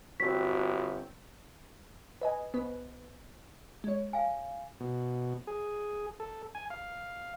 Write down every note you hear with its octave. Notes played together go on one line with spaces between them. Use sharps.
G1 C4 F#4 C#5 B6
B4 D#5 G#5
C2 B3 B4
G#3 C#5
F5 G#5
B2
G#4
A4
G#5
F5